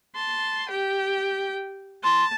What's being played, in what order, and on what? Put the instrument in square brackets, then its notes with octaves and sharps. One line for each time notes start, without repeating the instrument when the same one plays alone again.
[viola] A5 C6
G4 G5
[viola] A5 [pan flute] C6